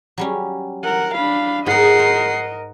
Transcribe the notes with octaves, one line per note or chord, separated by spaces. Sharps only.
F#3 G3 C#4
A#4 F#5
D4 F5 B5
G#2 D#4 A#4 D#5 F#5 C7
C5